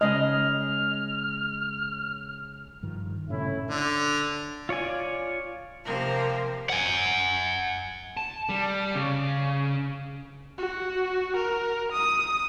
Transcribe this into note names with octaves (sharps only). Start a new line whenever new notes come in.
C#3 G#3 C#4 D#5 F6
G2 D#3 F3
G2 A#2 C#3 A3 C#4 E4
D3
F4 C#5 D5 G#5
C3 F3 A#3 A#4
F#5 G#5
A5
G3
C#3
F#4
A#4
D#6